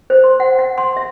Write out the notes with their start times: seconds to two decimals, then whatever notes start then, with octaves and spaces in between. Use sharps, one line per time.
0.10 C5
0.24 C6
0.40 F#5
0.59 F#5
0.78 C6
0.97 E5